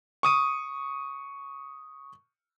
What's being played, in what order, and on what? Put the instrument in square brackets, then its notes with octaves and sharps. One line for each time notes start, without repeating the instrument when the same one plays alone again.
[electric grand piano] C#6 D#6 D#7